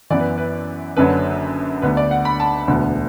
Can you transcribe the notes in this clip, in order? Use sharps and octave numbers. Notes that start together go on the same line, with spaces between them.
F#2 E3 B3 D5
B4
B4
F#1 F#2 D3 F#3 B4
D2 D3 B3 B4
D5
F#5
B5
A5
E1 D2 D3 B3